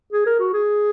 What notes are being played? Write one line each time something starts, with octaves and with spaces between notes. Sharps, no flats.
G#4
A#4
F#4
G#4